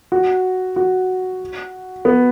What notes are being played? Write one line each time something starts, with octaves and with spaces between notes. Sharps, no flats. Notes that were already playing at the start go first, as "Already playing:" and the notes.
F#4
F#4
B3